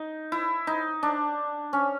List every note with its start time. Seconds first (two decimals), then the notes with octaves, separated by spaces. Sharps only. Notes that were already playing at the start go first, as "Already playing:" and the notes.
Already playing: D#4
0.32 E4
0.67 D#4
1.03 D4
1.73 C#4